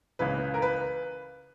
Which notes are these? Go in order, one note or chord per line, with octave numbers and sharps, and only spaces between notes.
C#2 C#3 E3 B4
A#4
B4